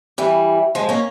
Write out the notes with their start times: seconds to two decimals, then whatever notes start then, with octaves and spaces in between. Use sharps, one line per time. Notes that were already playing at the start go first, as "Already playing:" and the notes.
0.18 E3 G3
0.75 F3 G#3
0.89 A#3 C#4